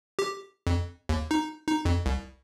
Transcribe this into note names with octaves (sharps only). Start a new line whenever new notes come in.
G4
F2
D#2
D#4
D#4
F2
C2